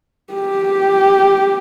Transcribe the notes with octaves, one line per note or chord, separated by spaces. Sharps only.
G4